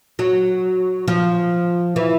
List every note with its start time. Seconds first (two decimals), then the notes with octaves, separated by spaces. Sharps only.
0.19 F#3
1.08 F3
1.96 E3